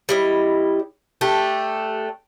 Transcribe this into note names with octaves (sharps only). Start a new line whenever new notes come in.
G3 E4 D#5
A3 D4 G4